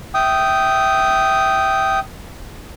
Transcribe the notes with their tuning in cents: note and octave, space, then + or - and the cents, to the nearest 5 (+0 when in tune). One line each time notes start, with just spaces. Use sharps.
E5 +0 G5 -15 D#6 +0